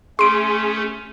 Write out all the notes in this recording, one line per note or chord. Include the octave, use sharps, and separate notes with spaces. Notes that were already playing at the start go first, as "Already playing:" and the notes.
A3 C#4 G#4 C6 D7